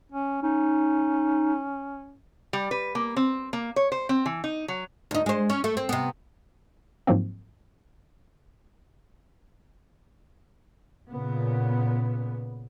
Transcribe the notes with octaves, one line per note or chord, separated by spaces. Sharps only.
C#4
C#4 D#4
G3
B4
A#3
C4
A#3
C#5
C5
C4
E3
D#4
F#3
D2 D#4
G#3 C5
C#4
A3
C4
C3 B3
G#2 F3 F#3 A#3 C4
A#2 C#3 B3